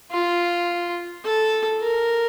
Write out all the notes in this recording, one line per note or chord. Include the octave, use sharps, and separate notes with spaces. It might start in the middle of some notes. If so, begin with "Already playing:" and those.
F4
A4
A#4